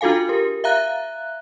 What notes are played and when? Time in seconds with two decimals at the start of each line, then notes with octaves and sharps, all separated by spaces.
0.01 D4 F4 F#4 A4 F5 G#5
0.29 G4 A#4
0.64 E5 F5 A#5 F#6